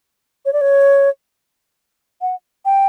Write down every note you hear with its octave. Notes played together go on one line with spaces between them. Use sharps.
C#5
D5
C#5
F#5
G5